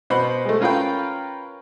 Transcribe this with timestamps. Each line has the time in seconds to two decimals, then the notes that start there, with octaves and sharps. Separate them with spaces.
0.10 B2 C5 B5
0.45 G#3 A3
0.61 C#4 F4 A#4 B4 F5 G5